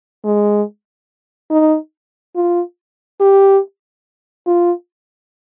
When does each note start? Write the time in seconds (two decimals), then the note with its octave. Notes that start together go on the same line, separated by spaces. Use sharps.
0.24 G#3
1.51 D#4
2.35 F4
3.20 G4
4.46 F4